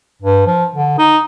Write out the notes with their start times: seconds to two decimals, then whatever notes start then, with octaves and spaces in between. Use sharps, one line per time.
0.22 G2
0.47 F3
0.75 D3
0.98 D#4